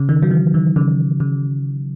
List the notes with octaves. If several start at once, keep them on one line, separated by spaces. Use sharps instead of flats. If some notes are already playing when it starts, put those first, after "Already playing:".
Already playing: C#3
D#3
F#3
E3
D#3
C#3
C#3